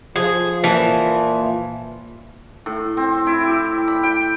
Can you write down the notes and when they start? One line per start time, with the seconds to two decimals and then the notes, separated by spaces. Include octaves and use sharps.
0.16 F3 G#4
0.64 A#2 E3 F3
2.66 A2
2.97 C4
3.27 E4
3.47 G4
3.88 B5
4.03 G5